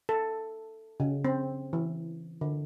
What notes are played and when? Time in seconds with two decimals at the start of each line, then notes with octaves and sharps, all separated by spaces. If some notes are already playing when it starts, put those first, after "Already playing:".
0.09 A4
1.00 C#3
1.25 C4
1.73 E3
2.41 D3